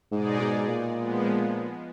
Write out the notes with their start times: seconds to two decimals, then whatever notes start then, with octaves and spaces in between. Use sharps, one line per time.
0.12 G#2 B2 G#3 D#4 G#4 D5
0.41 G#2
0.69 A#2
0.97 F3 G#3 B3